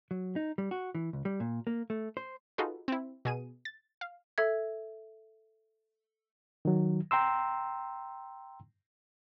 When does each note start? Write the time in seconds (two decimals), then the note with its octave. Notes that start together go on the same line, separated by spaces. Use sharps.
0.11 F#3
0.36 D#4
0.58 G3
0.71 F#4
0.95 E3
1.13 C#2
1.25 G3
1.40 A#2
1.67 A#3
1.90 A3
2.17 C5
2.58 D#4 F4 F#4 G#4 A4 B4
2.88 C4 E4
3.25 B2 G#4 D#7
3.65 A6
4.01 F5
4.38 A4 E5 G#6
6.65 D#3 F#3
7.11 G5 A#5 C6 E6